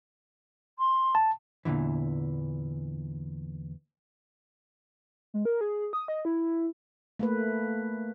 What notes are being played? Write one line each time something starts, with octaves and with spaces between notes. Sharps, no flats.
C6
A5
E2 G2 A#2 D3 E3
G#3
A#4
G#4
D#6
D#5
E4
A3 A#3 B4